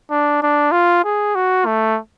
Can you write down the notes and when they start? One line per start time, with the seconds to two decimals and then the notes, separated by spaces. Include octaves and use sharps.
0.11 D4
0.42 D4
0.72 F4
1.05 G#4
1.35 F#4
1.66 A3